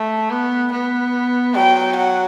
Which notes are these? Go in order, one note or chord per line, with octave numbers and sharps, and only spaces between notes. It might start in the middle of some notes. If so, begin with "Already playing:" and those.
Already playing: A3
B3
B3
F#3 G5
F#5